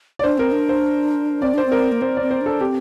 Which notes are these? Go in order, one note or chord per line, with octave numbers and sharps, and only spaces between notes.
D5
D4 C5
C4 A#4
D4
C5
C4 D5
D4 C5
C4
A#4
A#3
C4 C5
C4 D5
C5
D4 A4
C4 G4